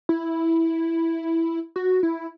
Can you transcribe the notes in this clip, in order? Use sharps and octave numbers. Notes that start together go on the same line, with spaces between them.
E4
F#4
E4